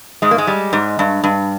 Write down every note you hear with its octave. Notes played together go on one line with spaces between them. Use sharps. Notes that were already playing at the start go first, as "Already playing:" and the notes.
G#2 G#3
A#3
G#3
G3
G#2
G2
G2